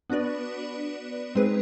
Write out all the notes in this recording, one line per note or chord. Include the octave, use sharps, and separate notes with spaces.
B3 D4 F#4 B4 D5
G#3 C4 D#4 G#4 B4